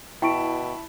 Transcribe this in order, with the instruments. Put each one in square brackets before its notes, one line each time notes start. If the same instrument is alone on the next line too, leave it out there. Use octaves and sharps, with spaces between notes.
[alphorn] B2 [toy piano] E4 [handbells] E5 A5 B5 [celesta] G5 C#6 D7